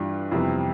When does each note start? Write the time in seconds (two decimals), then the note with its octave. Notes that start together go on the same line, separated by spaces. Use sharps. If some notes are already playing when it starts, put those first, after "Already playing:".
Already playing: G2 E3 D4 F4
0.31 F2 C3 E3 G3 B3